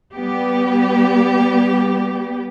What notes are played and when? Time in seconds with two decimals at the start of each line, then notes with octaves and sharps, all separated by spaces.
0.13 G3 B3 G4